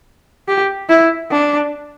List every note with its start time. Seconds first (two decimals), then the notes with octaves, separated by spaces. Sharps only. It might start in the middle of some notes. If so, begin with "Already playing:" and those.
0.48 G4
0.89 E4
1.31 D4